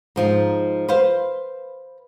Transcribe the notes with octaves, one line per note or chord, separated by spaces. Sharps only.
G#2 F3 D#4
B4 C5 F5